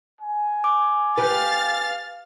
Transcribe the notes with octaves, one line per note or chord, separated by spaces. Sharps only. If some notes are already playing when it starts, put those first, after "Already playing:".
G#5
D6
G4 B4 F5 F6 A6